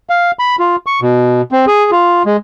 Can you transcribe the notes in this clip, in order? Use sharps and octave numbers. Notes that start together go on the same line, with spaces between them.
F5
B5
F4
C#6
B2
C4
G#4
F4
G#3